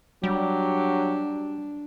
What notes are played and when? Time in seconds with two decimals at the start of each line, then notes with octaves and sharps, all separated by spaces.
0.24 F#3 G3 D4 G4